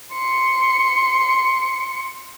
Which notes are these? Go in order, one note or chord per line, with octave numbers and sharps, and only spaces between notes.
C6 C#7